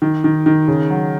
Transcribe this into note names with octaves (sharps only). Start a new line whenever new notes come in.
D#3
D#3
D#3
C#3
F#3